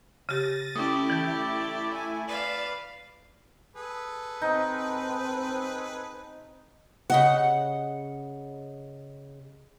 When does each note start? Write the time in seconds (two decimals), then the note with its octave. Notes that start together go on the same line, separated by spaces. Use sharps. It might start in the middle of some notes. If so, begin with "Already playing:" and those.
0.29 C#3 G4 A6 A#6 D#7
0.75 A3 C#4 E4 G4 D5 D#6
1.10 E3 G6
1.93 G#5
2.28 B4 D5 F5 E7
3.76 G#4 A4 B4
4.42 C4 D#4
7.10 C#3 D#5 F#5